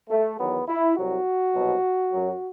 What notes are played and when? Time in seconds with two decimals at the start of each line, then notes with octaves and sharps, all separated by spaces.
0.10 A3
0.39 E2 D#3 F#3 B3
0.68 E4
0.97 C2 C3 F#3 F#4
1.54 C2 B2 F#3
2.12 F#2 F#3